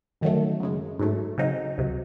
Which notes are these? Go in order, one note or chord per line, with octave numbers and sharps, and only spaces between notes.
F#2 D#3 F#3 A3
F#2 C#3 G#3
G#2 F#3 A3
C#3 F#3 C4 D#4
C#2 C3 F#3